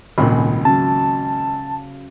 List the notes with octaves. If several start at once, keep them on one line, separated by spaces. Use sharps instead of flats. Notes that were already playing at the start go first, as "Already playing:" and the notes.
D#1 G#1 C#2 A#2 B5
C#3 F#3 A5